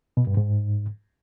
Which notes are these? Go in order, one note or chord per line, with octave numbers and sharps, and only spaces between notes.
B2
G2
G#2